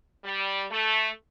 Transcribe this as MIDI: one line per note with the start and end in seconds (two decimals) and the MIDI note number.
0.24 0.64 55
0.71 1.08 57